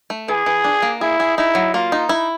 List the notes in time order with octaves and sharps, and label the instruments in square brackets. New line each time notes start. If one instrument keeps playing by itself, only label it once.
[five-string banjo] A3
[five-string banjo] E3 [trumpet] G#4
[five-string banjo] E3
D4
A#3
[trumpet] E4 [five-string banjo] G#4
[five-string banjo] G#4
[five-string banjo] D#4 [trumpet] E4
[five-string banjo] F#3
[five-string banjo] A#3 [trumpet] F4
[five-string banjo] D#4
E4